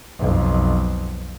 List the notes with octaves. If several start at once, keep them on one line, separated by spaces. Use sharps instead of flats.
B1 F2